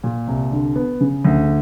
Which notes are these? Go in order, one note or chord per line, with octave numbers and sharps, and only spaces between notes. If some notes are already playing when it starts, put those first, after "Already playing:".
A#2
C2
D3
B3
C#3
D2